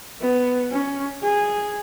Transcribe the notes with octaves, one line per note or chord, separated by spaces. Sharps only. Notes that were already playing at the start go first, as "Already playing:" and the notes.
B3
C#4
G#4